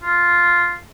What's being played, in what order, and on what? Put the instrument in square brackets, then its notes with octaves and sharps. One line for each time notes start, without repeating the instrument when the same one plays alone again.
[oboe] F4